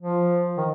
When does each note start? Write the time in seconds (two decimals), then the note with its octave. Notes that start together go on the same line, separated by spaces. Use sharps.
0.01 F3
0.58 D#3